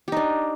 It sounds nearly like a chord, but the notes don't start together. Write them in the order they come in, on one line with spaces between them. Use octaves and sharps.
G4 D#4 D4